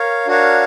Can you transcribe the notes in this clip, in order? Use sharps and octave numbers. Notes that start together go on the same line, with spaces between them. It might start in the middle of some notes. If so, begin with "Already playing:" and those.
Already playing: A#4 C#5 F5
D4 F#4 A#4 C#5 F5